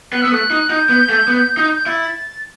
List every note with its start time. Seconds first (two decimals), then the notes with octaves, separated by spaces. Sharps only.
0.12 B3 F#6
0.22 B3 E6
0.32 A3 F#6
0.50 D#4
0.70 D#4 G6
0.89 B3
1.09 A3
1.28 B3
1.57 D#4
1.75 G6
1.87 E4 A6